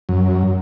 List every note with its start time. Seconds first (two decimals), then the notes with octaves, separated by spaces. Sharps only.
0.09 F#2